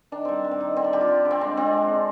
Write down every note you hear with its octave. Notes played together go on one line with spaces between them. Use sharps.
D#3 D4
G3 C4
G3
C4
D#3
D3 C4
D4
G3 G4
F4
G3
D3
C4
G#3 D4
G#3 C4
G#3
D3